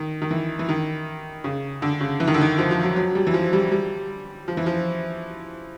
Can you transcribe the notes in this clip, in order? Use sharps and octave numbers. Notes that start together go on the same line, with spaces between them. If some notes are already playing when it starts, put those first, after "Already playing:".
Already playing: D#3
D#3
E3
E3
D#3
C#3
D3
C#3
E3
D#3
D3
D#3
F3
F3
F#3
F#3
G3
E3
F3
G3
G3
F3
E3
F3